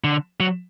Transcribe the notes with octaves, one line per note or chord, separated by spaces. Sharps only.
D3
F#3